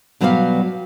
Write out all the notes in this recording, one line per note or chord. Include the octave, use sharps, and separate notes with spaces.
B2 F#3 G3 B3 G4 F5